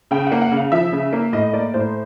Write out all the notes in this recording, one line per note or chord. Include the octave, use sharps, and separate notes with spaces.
C#3 G5
F#5
A#3
F#5
C#3
F5
F3 E5
C#3
A#3
A2 D#5
A#3 D5
A2 C5